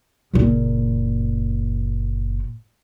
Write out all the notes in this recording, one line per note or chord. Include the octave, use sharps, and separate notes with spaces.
F#1 A#2